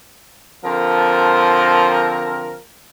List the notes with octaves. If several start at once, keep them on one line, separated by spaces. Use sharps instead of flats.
D3 F3 C4 A#4